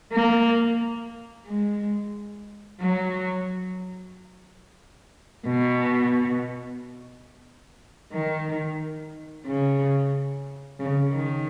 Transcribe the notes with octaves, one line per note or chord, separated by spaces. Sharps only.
A#3
G#3
F#3
B2
D#3
C#3
C#3
D#3